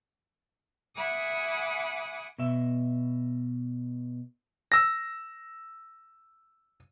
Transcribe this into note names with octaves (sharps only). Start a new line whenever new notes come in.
E5 F#5 G#5 B5 D6 D#6
B2 E5
E6 A#6